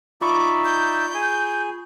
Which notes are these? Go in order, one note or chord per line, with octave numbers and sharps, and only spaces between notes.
D#4 F4 D5 E5 B5 C#6 D6
G6
G#4 G#5